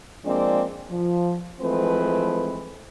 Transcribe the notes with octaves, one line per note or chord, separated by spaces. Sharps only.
F3 G#3 A#3 C4 D4 D5
F3
E3 F3 G#3 A3 C4 B4